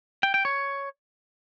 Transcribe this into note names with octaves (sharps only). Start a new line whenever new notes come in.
G5
G5
C#5